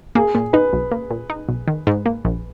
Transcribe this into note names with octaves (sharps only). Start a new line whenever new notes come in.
A#3 G#4
A#2
D#4 B4
B1
A#3
A#2
D#4
B1
D#3
G#2
A#3
A#1